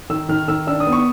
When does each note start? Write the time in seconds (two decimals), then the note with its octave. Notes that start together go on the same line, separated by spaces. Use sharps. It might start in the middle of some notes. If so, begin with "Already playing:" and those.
0.10 D#3 E6
0.29 D#3 F6
0.48 D#3 E6
0.67 D4 E6
0.80 D#6
0.87 B3
0.93 C#6